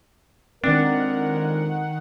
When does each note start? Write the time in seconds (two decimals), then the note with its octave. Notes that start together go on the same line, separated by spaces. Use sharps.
0.64 F2 D#3 G#3 C4 D4 A#4 F#5